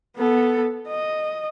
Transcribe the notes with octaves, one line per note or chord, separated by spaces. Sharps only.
B3 A4
D#5